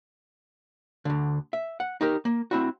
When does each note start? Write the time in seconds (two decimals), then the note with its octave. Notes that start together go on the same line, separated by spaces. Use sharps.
1.05 D2 D3
1.53 E5
1.80 F#5
2.01 D#4 G4 A#4
2.25 A#3
2.51 C4 E4 F#4